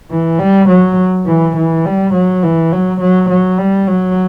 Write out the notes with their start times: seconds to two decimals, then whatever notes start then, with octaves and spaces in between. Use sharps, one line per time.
0.11 E3
0.39 G3
0.69 F#3
1.26 E3
1.56 E3
1.85 G3
2.13 F#3
2.43 E3
2.72 F#3
3.01 F#3
3.30 F#3
3.59 G3
3.88 F#3